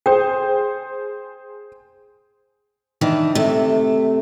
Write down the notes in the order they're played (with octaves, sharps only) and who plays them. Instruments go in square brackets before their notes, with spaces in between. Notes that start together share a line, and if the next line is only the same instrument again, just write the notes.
[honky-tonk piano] G#4 C5 [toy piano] G5
[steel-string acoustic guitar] D#3 E3 D4
C3 A3